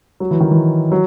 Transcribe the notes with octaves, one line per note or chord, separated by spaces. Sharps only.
F#3
E3
D#3
E3
F#3